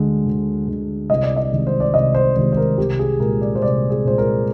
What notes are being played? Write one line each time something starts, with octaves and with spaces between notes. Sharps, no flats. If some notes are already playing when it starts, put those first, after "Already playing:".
Already playing: D2 D3 G#3
D2
D3 G#3
C2 D#5
D5
D#5
C3 D#3 G#3
C5
D5
C2 D#5
C5
C3 D#3 G#3 C5
C5
A#4
C2 G4
G#4
A#2 G#3 A#4
D5
C5
C2 D5
G#4
A#2 G#3 C5
A#4